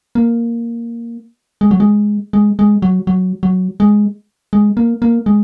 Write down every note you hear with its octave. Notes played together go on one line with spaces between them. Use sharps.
A#3
G#3
F#3
G#3
G#3
G#3
F#3
F#3
F#3
G#3
G#3
A#3
A#3
G#3